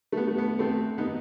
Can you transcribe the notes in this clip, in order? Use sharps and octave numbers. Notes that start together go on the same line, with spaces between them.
A3
B3
A3
B3
A3 C4
B3 D#4